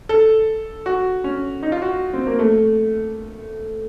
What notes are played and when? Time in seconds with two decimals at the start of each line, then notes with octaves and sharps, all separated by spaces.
0.09 A4
0.86 F#4
1.24 C#4
1.63 D#4
1.72 F4
1.82 F#4
2.13 C4
2.27 A#3
2.39 A3